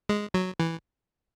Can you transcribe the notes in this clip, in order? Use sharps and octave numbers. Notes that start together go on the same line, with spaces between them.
G#3
F#3
E3